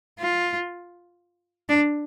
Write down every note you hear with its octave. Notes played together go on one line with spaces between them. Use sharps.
F4
D4